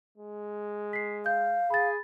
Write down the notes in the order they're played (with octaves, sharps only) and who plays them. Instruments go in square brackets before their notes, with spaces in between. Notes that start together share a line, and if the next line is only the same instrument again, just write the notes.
[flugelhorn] G#3
[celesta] B6 C7
[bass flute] F5 [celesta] G6
[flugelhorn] G#4 [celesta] B5 A6